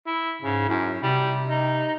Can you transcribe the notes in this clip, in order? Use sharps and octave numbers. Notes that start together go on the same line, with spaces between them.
E4
G#2 C#3
F#2 E4
C3 G3
D#4